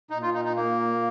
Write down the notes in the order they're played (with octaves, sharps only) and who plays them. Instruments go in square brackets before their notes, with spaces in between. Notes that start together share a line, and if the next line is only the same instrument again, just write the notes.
[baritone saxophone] A#2 [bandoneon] D#4
[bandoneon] F4
D#4
D#4
A#3